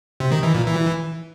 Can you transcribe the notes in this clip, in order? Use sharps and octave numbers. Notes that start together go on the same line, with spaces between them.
C3
D#3
E3
A#2
E3